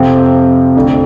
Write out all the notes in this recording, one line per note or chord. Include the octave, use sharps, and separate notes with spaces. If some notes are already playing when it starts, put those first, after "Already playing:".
Already playing: F2 C3 F3 C4
F2 D3 A3